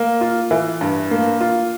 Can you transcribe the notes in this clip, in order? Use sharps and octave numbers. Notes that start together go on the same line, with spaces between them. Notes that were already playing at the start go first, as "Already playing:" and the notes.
Already playing: A#3
F4
E3
G2
A#3
F4